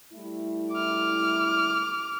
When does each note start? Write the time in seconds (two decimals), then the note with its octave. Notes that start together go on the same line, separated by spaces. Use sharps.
0.13 G3 A3 E4
0.73 D6 F6